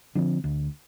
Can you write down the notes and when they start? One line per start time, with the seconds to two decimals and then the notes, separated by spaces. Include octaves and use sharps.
0.15 D3 F3 C4
0.44 D2